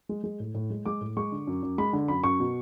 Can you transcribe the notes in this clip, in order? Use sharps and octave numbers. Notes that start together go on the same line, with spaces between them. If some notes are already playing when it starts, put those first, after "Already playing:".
G#3
G#3
A2
A2
G#3
G#3 D6
A2
G#3 C#6
D3
F#2
F#2
G#3 B5
D3
F#2 B5
F#2 C#6
B2